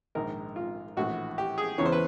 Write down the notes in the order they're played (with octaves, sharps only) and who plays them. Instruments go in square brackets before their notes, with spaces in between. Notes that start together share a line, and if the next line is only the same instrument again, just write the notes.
[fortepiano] A#1 G#2 D#3 A#4
F4
A#1 A2 E3 F#4
G4
G#4
E2 C#3 E3 C#5
C5
B4